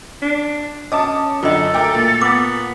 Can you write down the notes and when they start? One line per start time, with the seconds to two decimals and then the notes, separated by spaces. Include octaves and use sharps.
0.22 D4
0.92 C#4 D#5 A5 D6 D#6
1.43 F#2 D3 F4 A4 D#5
1.74 A3 A#4 G5 D6
1.95 A#2
2.21 B3 D6